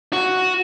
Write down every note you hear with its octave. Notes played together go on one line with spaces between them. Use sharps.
F#4